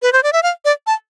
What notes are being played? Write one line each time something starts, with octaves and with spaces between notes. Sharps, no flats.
B4
C5
D5
E5
F5
D5
A5